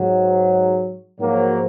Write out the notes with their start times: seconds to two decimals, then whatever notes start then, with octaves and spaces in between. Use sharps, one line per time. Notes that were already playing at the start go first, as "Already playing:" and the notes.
Already playing: G#2 F#3
1.20 G#2 F3 F#3 A#3